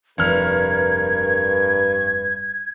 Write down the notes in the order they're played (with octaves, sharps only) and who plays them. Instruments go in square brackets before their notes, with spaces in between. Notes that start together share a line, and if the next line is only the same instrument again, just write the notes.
[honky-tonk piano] F1 F6 [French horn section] G2 B4 [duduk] A#4 [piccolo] G#6